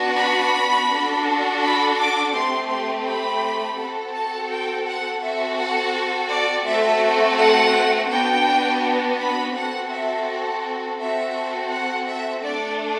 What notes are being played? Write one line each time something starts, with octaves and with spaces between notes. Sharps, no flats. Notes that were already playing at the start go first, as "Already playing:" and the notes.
Already playing: B3 D4 F#4
B5
D4 F#4 A4
B5
D6
A3 C4 G4 C6
C6
B5
C4 F#4 A4
A5
G5
F#5
C4 F#4 A4 E5
F#5
D5
A3 C4 F#4 A4 E5
F#5
B3 D4 F#4 G5
B5
C4 F#4 A4 F#5
E5
C4 F#4 A4 E5
F#5
E5
A3 D4 A4 D5